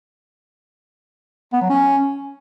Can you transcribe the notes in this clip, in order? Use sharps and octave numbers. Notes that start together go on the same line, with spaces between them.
B3
F#3
C#4